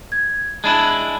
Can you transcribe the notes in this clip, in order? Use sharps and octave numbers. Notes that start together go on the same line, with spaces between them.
G#6
G#3 D4 E4 A5 B5 F#6